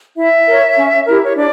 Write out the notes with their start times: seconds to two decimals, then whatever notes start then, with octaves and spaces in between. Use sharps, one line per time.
0.17 E4 E5
0.48 A#4 C#5
0.77 C#4
1.06 E4 G4 A#4
1.24 C#5
1.35 D4 D5